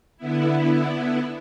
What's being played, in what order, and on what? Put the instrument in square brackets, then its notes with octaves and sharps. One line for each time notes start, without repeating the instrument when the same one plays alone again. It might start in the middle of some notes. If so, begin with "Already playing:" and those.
[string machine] D3 B3 E4